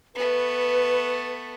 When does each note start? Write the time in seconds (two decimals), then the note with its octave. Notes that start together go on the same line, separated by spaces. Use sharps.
0.15 A3 B3 B4